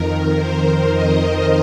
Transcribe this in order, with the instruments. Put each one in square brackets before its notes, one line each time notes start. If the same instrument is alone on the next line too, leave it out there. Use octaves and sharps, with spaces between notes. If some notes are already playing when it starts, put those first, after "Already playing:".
Already playing: [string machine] F2 D#3 A#4
C5
D#5